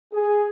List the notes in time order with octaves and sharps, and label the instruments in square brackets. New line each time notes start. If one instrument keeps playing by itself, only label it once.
[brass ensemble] G#4